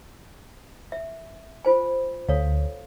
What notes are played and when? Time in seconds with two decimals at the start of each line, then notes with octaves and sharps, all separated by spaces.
0.92 E5
1.65 F4 C5 G#5
2.29 D2 A4 C#5 F5